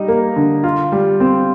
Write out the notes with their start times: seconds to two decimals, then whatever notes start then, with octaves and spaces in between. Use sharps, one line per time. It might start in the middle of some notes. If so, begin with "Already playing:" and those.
Already playing: G3 D#4
0.08 A#3
0.36 D3
0.64 F4
0.92 G3
1.20 C4